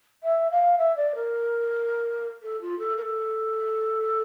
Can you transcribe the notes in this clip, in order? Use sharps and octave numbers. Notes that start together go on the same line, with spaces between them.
E5
F5
E5
D5
A#4
A4
F4
A4
A#4
A4